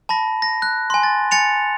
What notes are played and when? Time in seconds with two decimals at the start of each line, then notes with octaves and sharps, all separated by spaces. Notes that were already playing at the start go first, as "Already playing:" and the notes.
0.09 A5 B5 A#6
0.42 A#6
0.62 F#6
0.90 G#5 C6
1.03 A6
1.31 G#5 A6 C#7 F7